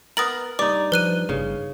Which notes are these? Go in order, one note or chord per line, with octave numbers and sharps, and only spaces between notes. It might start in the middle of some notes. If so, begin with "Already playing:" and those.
B3 A#4 D#6 A6 F#7
G2 D#4 D5 D6
F3 B4 F#6 D#7
G1 C#3